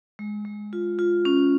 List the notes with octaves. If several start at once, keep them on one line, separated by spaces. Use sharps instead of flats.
G#3
G#3
F4
F4
C#4